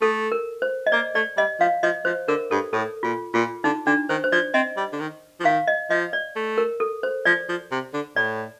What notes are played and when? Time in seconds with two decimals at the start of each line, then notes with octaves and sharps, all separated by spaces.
0.01 A3 A4
0.32 A#4
0.62 C5
0.87 D#5
0.92 A#3 D5
1.15 A3 D5
1.37 G3 D#5
1.60 F3 F5
1.83 F3 D#5
2.05 F3 C5
2.28 D3 A#4
2.51 G2 A4
2.73 A2 A4
3.03 A#2 F4
3.34 A#2 F4
3.64 D3 D#4
3.86 D3 D4
4.09 D#3 C5
4.24 C5
4.32 F3 D5
4.54 C4 D#5
4.77 G3
4.93 D3
5.00 D#3
5.40 F3
5.45 D#3 F5
5.68 D#5
5.90 F3 D#5
6.13 D5
6.36 A3
6.58 A#4
6.80 A4
7.03 C5
7.25 F3 D5
7.49 F3
7.72 C3
7.94 D3
8.16 A2 D5